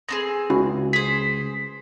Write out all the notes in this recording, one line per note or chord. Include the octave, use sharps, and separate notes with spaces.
B3 C4 G#4 A#6
C#2 C#4 E4 F#4
G#4 C5 B6